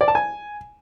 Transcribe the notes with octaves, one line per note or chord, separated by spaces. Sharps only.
D5
A5
G#5